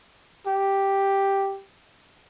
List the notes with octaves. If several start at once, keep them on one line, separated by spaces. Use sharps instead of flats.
G4